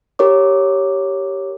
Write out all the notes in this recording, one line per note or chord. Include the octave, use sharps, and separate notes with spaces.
G4 A#4 C#5 D6